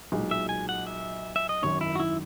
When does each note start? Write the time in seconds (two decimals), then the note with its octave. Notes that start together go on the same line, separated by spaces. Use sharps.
0.12 B1 A#2 G#3
0.31 E5
0.49 G#5
0.69 F#5
0.87 E5
1.36 E5
1.49 D#5
1.62 G#1 F#2 D#3 C#5
1.81 E4
1.95 F#4
2.00 E4